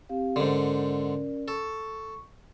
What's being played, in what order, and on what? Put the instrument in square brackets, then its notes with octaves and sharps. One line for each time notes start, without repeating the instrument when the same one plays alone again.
[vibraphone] C4 G4 F5
[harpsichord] G#2 D3 [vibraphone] C#4 A#4 D5
[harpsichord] A4 [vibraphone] C#6